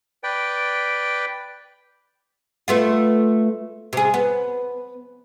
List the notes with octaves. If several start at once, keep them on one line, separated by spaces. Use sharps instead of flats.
B4 D5 G5
A3 B3 F4
C3 G#4
B3